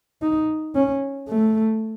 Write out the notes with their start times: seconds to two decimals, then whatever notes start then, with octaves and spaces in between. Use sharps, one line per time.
0.22 D#4
0.75 C#4
1.28 A3